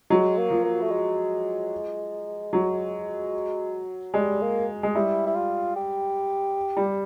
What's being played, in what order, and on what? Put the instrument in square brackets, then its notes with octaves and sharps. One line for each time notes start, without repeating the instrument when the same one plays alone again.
[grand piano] F#3 [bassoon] G#3
[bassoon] A#3
[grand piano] F3
[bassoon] A#3
A3
G#3
[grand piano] F#3
[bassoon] G3 [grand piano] G#3
[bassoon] A#3
[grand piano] G#3
[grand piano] G3 [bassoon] E4
[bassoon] E4
F4
G4
[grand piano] G3